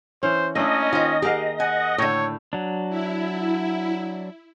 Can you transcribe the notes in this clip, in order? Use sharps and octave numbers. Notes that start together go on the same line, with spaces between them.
E3 C#4 C5
A3 A#3 C#4 D4 E4 D#5
D#3 F4 C5
G4 G#4 A#4 F5 F#5
F#5 G#5
A2 D3 C#5 G5
F#3 D4
E4